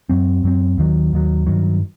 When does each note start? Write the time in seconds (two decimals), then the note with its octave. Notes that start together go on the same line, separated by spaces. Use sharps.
0.09 F#2 F#3 C4
0.44 F#2 F#3 C4
0.78 D#2 D#3 F#3
1.13 D#2 D#3 F#3
1.46 G2 D#3 F#3